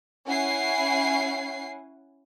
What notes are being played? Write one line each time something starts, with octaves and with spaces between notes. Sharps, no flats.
C#4 E4 F#5 G#5 C7